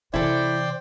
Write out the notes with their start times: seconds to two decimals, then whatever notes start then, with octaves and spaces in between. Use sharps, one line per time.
0.14 C3 E3 E4 A4 C5 D5 G5